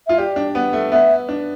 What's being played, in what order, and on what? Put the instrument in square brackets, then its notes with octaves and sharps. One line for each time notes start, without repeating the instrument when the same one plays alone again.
[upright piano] F4 [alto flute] E5
[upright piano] G4 [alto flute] D5
[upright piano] D4
B3
A3
[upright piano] B3 [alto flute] E5
[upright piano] D4